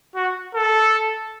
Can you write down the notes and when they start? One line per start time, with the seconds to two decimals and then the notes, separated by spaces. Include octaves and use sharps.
0.16 F#4
0.55 A4